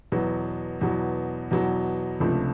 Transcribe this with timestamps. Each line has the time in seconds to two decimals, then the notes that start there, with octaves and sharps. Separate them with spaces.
0.12 E2 B2 F#3
0.81 E2 B2 F#3
1.51 E2 B2 F#3
2.20 C#2 C3 F3 A3 D4